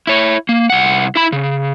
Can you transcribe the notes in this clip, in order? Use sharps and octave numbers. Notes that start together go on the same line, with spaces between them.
E4 C#5
A#3
C2 F#5
E4 B5
C#3